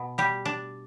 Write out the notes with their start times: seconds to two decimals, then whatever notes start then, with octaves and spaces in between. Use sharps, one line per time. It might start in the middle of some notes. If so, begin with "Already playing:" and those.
Already playing: B2
0.18 G3 G4
0.45 D4